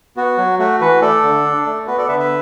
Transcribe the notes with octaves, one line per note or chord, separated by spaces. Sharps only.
B3 F#4
F#3
A3 F#4
E3 F#4 B4
A3 A4 D5
D3
D4
A3
B3 F#4 B4
A4 D5
D3 B4 E5
B4 E5